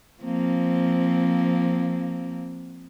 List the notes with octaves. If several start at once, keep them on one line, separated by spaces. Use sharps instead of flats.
F3 A#3 C4